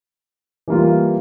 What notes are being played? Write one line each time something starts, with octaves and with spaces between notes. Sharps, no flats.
E3 G3 A#3 F4